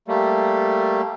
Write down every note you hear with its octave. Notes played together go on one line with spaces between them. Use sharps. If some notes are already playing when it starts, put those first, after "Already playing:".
G3 A3 A#3